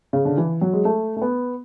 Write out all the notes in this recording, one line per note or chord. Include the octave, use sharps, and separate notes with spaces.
C#3
D3
E3
F#3
G#3
A3
A3
B3